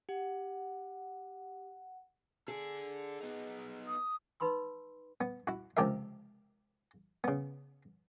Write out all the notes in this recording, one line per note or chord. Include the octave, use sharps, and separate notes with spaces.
G4 F#5
D4 G#4 A4
B3 D#4
D#6
D#4 B4 B5 C6 E6
B3
E4 F#4
C#2 C3 F3 G4 A#4 E5
C#3 B3